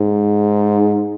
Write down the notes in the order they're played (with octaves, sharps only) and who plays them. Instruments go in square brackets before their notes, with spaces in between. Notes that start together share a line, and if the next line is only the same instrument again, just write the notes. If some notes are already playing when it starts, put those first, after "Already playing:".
Already playing: [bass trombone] G#2